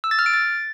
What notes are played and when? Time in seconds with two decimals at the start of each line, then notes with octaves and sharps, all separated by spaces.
0.04 E6
0.11 A6
0.19 F6
0.26 D7
0.34 A6